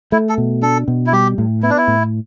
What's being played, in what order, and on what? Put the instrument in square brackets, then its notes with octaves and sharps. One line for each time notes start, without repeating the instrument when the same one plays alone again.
[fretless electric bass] A3 [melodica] E4
[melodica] A4
[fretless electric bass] B2
[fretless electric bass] D4 [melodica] A4
[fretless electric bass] B2
[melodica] E4
[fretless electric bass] G3 [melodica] G4
[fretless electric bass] A2
[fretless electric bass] B3 [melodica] E4
[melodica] D4
E4
[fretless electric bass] A2